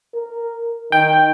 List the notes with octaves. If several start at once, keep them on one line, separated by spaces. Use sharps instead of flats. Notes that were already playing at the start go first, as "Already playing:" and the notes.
A#4
D#3 G5